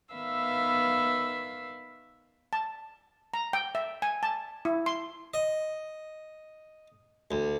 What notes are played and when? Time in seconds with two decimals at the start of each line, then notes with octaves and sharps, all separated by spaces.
0.14 D#3 B3 B4 E5 F5 E6
2.53 A5
3.34 A#5
3.53 G5
3.75 E5
4.02 G#5
4.23 A5
4.65 E4
4.86 C6
5.34 D#5
7.31 D2